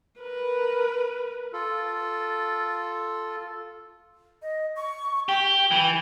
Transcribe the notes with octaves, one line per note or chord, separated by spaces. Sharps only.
A#4 B4
F4 A4
D#5
C#6
G4 G5
E3 B5